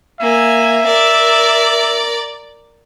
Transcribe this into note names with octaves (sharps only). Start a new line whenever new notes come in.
A#3 E5 G#5
A#4 D5